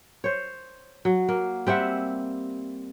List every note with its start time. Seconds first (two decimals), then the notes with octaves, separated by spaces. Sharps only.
0.24 C5 C#5
1.05 F#3
1.29 A#3
1.67 G3 C4 E5 F#5